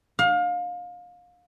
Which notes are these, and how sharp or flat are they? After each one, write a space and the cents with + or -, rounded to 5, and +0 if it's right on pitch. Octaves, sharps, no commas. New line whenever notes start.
F5 +30